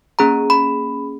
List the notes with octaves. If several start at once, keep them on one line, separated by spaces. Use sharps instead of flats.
A#3 C#4 G#4 A#5
B5